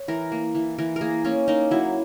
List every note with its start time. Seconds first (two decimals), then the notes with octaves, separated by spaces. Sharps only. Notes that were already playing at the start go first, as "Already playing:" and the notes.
Already playing: C#5
0.08 E3 A#4
0.32 A#3
0.55 E3
0.78 E3 A#4
0.96 A#4
1.01 A#3 G#4
1.25 A#3 C#4
1.48 A#3 D#4
1.71 F#3 E4